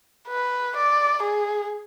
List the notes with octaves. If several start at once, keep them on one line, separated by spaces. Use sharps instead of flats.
B4
D5
G#4